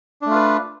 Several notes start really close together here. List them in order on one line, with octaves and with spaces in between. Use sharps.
D4 A3 F4 B4